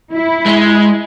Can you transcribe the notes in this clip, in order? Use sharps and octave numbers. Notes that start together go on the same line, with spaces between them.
E4
G#3